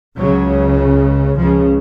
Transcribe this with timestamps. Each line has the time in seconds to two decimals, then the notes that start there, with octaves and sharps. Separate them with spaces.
0.17 C#2 C#3 F#3
1.38 C#2 C#3 F3